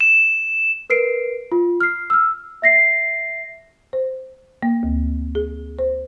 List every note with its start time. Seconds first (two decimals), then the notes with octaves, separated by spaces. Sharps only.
0.01 E7
0.90 A#4 B4 C7 D7
1.52 F4
1.81 F6 C7
2.10 E6 F6
2.62 E5 A#6 C7
3.93 C5
4.63 A#3
4.83 D2
5.35 G#4
5.79 C5